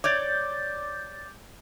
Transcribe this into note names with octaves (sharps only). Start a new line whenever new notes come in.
C#5 D5 D6 G6 A6